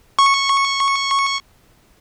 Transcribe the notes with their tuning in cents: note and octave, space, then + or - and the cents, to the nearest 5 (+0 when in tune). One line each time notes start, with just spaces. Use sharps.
C#6 -10